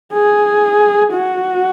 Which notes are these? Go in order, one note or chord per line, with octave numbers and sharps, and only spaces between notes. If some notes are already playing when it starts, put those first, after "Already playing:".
G#4
F#4